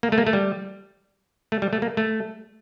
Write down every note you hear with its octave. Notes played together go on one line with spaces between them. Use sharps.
A#3
A3
A#3
A3
G3
A3
G3
A3
A#3
A3